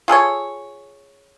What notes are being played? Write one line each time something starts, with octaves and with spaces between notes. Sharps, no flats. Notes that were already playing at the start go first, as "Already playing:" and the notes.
F4 G#4 A4 C#5